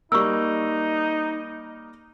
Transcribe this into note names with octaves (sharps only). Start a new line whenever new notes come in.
G3 A#3 D#4 C#6 E6